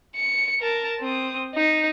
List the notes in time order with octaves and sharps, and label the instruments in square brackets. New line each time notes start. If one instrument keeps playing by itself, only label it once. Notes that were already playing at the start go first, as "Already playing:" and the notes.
[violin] C#7
A#4 A5
C4 D#6
D#4